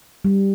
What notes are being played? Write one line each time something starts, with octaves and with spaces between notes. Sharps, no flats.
G3